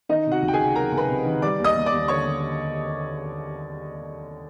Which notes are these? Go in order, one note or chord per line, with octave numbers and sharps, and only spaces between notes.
D#3 D#4 D#5
C3
F#4 F#5
C#2
G5
G#4 G#5
C3
F#3 A#4 A#5
C#2
B4 B5
C3
D#3
G3 D5 D6
D#2
D#5 D#6
D#2
D5 D6
D#2
D3 C#5 C#6
D3